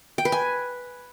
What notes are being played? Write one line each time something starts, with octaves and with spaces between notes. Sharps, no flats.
G5
B4
G#5